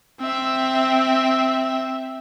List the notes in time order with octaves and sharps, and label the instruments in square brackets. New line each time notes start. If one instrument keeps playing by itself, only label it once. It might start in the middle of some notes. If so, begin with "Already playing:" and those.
[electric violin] C4 E5